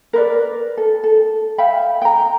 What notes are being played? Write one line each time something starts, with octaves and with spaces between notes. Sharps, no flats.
A#4 B4 D5
A4
A4
E5 F5 G5 B5
G5 A#5